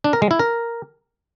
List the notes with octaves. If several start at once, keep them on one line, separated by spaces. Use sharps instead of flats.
D4
A#4
G#3
E4
A#4